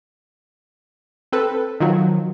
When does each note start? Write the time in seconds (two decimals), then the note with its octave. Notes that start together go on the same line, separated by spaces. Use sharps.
1.32 C4 A4 B4
1.80 D#3 F3 F#3